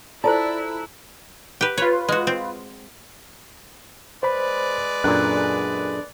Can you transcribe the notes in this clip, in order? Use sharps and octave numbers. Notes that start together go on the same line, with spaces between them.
E4 F4 A4 C5 D5 A5 A#5 F#6
G4 B4
F4 B4 C#5
G#3 F#4
C4
G#3 B4 C5 D5 B5
F#2 A#2 D4 G#4 A4 F#6